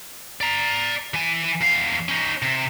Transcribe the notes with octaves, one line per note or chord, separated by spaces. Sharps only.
D5 A#5
E3 G#5
E2 F5
C#4 D#4
C3